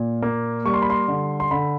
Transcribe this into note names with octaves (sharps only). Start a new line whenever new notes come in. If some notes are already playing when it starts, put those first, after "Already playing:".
Already playing: A#2
A#3
G3 C#6
C6
B5
C6
D3
C6
D3 B5